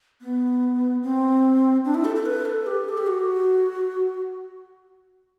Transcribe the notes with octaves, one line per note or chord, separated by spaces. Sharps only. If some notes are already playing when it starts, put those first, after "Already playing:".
B3
C4
D4
E4
A4
A4
B4
A4
G4
A4
G4
F#4